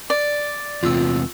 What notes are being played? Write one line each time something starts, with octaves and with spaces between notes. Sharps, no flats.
D5
E2 C3 F4 E6